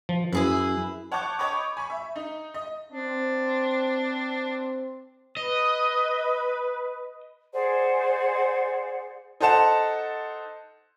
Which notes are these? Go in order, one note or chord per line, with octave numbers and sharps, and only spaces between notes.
F3
F#2 E4 G#4 B4
C#5 F#5 A5 C#6 D6 G6
C#5 D#5 G5 B5 C#6 D6
G#5 B5 C#6
E5
D#4
D#5
C4 D4
B4 D#5
G#4 C5 D5 F#5
D#4 A4 C5 F#5 A5 E7